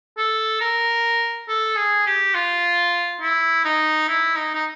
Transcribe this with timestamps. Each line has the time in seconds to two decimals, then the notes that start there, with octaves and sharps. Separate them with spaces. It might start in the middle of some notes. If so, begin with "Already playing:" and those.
0.17 A4
0.61 A#4
1.48 A4
1.76 G#4
2.06 G4
2.35 F4
3.21 E4
3.64 D#4
4.08 E4
4.36 D#4
4.55 D#4